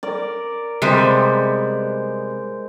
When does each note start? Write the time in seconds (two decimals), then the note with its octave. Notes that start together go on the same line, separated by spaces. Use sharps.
0.03 A#4 D5
0.82 C3 G3 G#3 B3 C5